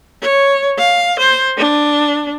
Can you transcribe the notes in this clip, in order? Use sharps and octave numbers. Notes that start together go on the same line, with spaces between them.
C#5
F5
C5
D4